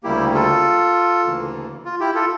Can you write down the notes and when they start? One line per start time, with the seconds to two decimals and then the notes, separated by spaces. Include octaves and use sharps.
0.03 D2 C#3 G3 A#3 E4 G4
0.34 F4 A4
1.25 D2 C#3 E3 A#3
1.85 F4
2.00 E4 G4
2.15 F4 A4